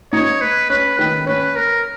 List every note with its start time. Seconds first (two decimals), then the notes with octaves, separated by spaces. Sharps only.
0.12 D#4 C#5
0.41 B4
0.70 C#4 B4
0.99 D#3 B4
1.26 C#4 B4
1.56 A#4